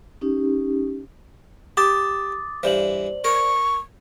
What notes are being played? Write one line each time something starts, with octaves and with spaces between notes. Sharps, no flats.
C#4 D#4 G4
G4 A5 D6 D#6 A6
G2 E3 C5 D5 F#7
A#4 C#6